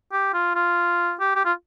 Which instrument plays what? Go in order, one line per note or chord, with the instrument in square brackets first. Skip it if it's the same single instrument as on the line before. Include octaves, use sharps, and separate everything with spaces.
[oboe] G4
F4
F4
G4
G4
F4